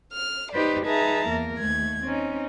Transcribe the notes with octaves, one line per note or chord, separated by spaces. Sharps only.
F6
D#4 G4 B4 C5 D5
D#4 G#4 B4 E5 A5 A#5
E2 A#3 A#4
D#2 A3 G#6
C4 C#4 D#4